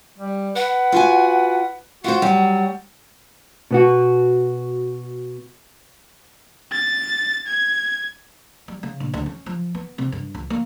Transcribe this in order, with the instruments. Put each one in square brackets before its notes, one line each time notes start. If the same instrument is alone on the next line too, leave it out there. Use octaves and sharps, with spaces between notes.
[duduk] G3
[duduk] B4 [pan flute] F#5
[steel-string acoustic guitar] F4 F#4 G#5
[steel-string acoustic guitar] F4 C5 [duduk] F#4 [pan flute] F#5
[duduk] F#3 [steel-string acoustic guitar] G3
[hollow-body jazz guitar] B2 B3 F#4
[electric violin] A6
G#6
[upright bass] G3
C#3
A#1
D2
C#4
F3
B3
C3
G2
C#2
A#3